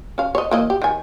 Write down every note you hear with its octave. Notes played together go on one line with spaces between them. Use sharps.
C#4 F5
C#5 D#5
E3 A#3 D#5
G4
D#3 G#5